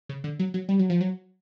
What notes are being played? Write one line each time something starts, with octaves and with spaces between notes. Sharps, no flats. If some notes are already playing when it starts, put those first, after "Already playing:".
C#3
D3
F#3
F#3
G3
F#3
F3
F#3